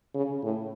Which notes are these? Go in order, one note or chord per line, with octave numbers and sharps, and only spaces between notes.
C#3
A2